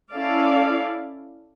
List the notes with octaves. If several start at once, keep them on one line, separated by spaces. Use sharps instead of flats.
C#4 E4 A4 D5 F5